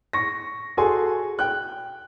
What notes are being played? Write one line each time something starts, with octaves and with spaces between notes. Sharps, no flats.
C#6 A#6
F#4 G#4 A4 G#5 C6
G5 F#6